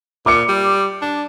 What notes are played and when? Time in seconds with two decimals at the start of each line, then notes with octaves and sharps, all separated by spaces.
0.26 A#2 D6 C#7
0.49 G3
1.02 D4